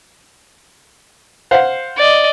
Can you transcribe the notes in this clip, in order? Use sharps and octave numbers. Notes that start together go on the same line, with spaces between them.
C5 F5 F#5
D5 D#5